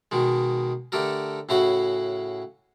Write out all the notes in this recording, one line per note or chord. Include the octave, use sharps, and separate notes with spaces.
B2 D#3 G#3
D3 A3 G4 A4 A#4
A2 C#3 E4 F#4 B5